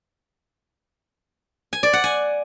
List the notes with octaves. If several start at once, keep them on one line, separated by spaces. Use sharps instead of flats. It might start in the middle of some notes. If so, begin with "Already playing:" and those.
G#5
D5
F#5
G#5